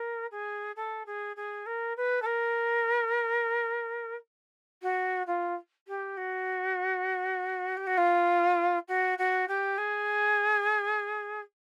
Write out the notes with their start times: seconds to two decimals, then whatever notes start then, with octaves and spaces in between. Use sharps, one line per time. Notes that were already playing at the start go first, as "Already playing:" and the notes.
Already playing: A#4
0.31 G#4
0.76 A4
1.06 G#4
1.36 G#4
1.66 A#4
1.97 B4
2.22 A4
2.26 A#4
4.82 F#4
5.27 F4
5.88 G4
6.17 F#4
7.77 G4
7.87 F#4
7.97 F4
8.88 F#4
9.18 F#4
9.48 G4
9.78 G#4